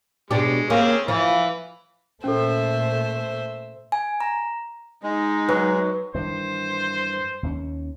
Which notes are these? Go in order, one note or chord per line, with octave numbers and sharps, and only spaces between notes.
B2 G#3 D4 G4
A#3 C4 C#4 G#4
E3 F3
A#2 A3 C#4 A4 C5 E5
G#5
A#5
G#3 D#4
F#3 B4 F#6
G2 D#3 E3 C5
D#2 A3 C#4